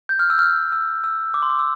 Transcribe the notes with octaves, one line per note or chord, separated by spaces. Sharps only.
G6
F6
E6
F6
E6
E6
D6
C6
D6
E6